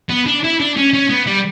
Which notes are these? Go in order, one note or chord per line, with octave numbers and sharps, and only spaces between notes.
B3
D4
E4
D4
C#4
C#4
B3
G3